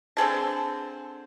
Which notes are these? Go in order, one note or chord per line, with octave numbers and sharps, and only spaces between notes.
D3 C4 G#4 A5